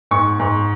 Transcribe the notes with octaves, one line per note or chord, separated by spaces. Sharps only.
G#2 C#6
G#2